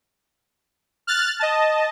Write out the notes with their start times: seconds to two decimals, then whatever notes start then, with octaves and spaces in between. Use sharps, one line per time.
1.07 F6 F#6 A6
1.39 D#5 A5